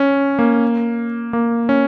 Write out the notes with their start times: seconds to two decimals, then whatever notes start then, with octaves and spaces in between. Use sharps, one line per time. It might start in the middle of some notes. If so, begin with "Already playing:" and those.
Already playing: C#4
0.39 A#3
1.33 A#3
1.69 C#4